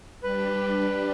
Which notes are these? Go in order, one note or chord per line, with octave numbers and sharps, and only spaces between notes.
G3 D4 G4 B4